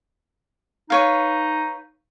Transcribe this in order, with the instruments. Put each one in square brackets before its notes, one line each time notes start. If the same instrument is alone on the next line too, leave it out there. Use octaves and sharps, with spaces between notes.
[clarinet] D#4 [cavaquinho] B4 C#5 F5